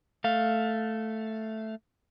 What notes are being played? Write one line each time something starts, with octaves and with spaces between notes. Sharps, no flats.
A3 F5